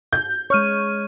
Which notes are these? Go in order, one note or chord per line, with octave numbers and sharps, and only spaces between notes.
G6
G#3 C#5 C#6 F6 D#7